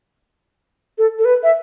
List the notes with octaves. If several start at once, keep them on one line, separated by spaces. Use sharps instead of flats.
A4
A4
B4
E5